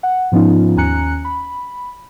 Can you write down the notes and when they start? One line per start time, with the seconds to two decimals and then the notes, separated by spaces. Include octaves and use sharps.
0.03 F#5
0.32 G#2 F3 B3 C#4 D#4 F4
0.76 D#2 C#4 G#5 A#5 F#6 C#7
1.25 B5